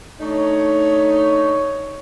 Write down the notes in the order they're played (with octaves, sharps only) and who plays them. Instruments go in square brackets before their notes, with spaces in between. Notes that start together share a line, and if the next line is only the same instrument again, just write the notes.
[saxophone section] A3 D4 D#4 [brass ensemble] C#5